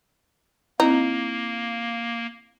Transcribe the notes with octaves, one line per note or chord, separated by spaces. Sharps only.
A#3 C4 D#4 E4